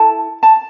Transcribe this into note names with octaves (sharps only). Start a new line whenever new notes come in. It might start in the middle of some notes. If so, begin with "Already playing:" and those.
Already playing: E4 A4 A5
A5